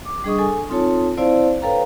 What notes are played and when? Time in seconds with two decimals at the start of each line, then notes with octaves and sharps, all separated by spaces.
0.05 D6
0.24 G3 D4 G#4 D#5 C#6 D#6
0.38 A4 G#5
0.70 C4 D#4 F4 A4 C#5 A5
1.17 C4 E4 C5 D5 F5 A5
1.62 A4 B4 C#5 F5 G5 A#5